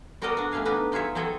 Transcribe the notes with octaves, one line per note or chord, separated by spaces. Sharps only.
B3 F#4 A4 A#4 D5 D#5
D4 F#4
A3 B3 C#4 F5 G#5
B3 D4 D#4 B4
D#4 F4 G#4 C#5 E5
F#3 C4 A4 C#5 D#5